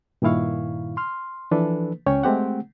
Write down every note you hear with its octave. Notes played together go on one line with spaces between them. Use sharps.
G2 A#2 D#3 E4 F5 C#6
C6 F6
E3 F3 D4 A4 B4
C#2 C#4 C#5 G5 C#6
G#3 A3 C4 G4 F#5